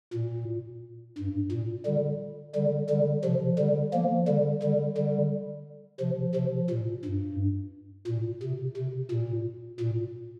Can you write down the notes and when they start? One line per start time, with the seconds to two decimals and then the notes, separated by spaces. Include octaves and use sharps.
0.14 A#2
1.18 G2
1.52 A#2
1.86 D3 G3
2.55 D3 G3
2.89 D3 G3
3.24 C3 F3
3.58 D3 G3
3.93 F3 A#3
4.28 D3 G3
4.63 D3 G3
4.97 D3 G3
6.00 C3 F3
6.35 C3 F3
6.70 A#2
7.05 G2
8.07 A#2
8.43 C3
8.77 C3
9.11 A#2
9.80 A#2